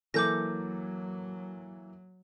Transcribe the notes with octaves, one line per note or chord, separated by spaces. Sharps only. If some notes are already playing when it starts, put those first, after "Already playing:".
E3 F#3 A#3 A4 D6 G6 A#6